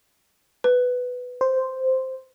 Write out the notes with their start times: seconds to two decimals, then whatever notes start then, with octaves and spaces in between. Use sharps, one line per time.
0.64 B4
1.41 C5